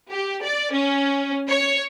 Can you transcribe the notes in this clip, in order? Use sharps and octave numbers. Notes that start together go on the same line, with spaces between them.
G4
D5
C#4
C#5